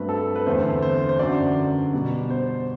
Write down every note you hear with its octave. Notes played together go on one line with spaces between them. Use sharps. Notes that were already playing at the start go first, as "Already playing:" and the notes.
Already playing: G2 F#3 A3 C4 B4
A4
B4
E2 D3 A3 C4 C5
C5
C5
F#2 D3 F#3 D5
B2 G3 B3
C5